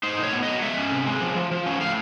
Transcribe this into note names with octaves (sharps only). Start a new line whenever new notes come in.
D#4 C5
A2 C#5
B3
F#3 D#5
G#3 E5
C#4
C3
G#3
F3
F3
F3
C#4
A2 F5